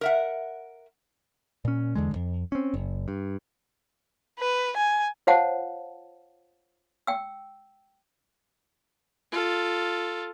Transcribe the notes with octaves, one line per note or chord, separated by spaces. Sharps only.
A#4 E5 F#5
A#2 C#4
E2 D3 G#3
D#1 F2
C4 C#4
F#1
G2
B4
G#5
F4 C5 C#5 F5 F#5 A5
G5 E6
F4 A4